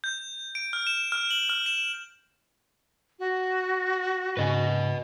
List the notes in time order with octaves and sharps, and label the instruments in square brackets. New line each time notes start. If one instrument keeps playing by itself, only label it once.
[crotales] G6
D7
F6
E7
F6
F#7
F6
E7
[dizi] F#4
[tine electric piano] G#2 C#3 G#5 [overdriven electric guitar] B4 D#5